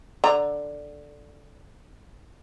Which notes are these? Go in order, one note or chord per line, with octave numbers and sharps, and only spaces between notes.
D3 A#5